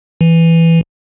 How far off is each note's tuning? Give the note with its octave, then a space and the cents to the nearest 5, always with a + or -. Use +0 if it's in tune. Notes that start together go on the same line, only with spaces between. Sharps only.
E3 +5